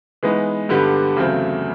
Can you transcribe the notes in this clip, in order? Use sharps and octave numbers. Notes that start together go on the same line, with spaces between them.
E3 G#3 B3 D#4
G2 D3 G3 B3
E2 C#3 F#3 A3 C4